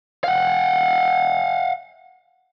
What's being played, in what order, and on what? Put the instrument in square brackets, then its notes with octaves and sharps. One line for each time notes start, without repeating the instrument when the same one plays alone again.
[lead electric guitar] F5 F#5